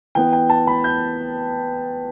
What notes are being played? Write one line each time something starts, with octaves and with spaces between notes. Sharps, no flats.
E3 B3 G5
G5
A5
B5
G6